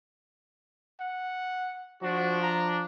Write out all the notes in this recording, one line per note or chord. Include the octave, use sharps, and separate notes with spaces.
F#5
F3 D4 F#4
A#5